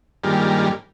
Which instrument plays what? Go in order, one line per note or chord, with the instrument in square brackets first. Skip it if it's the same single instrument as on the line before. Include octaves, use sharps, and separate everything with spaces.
[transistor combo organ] G2 D#3 F3 G3 G#3 A#3